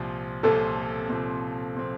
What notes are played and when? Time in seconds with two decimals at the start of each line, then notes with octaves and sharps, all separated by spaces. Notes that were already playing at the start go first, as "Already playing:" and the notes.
Already playing: C2 A#2 F3 C4
0.43 C2 A#2 F3 C4 A4
1.09 C2 A#2 F3 C4
1.77 A#2 F3 C4